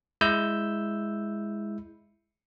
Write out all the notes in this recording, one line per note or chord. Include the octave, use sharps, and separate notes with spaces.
G#3 E4 E6 G6